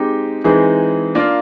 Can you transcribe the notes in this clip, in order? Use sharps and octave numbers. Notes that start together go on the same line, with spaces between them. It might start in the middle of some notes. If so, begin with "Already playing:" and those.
Already playing: G#3 C4 D#4 G4
E3 G#3 C4 D#4 G#4
A#3 D4 F4 A#4 D5